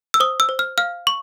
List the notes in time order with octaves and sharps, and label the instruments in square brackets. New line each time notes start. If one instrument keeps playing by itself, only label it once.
[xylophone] E6
C5 D#6
E6
C5
F6
F5 F6
C#6